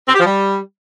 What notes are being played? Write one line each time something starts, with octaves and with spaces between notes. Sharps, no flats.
C4
G4
F3
G3